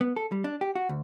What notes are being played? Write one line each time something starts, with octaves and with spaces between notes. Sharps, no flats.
B3
A4
G3
D4
G4
F#4
D2